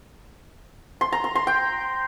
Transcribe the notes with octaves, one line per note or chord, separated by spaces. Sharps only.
C6
A#5
C6
C6
G5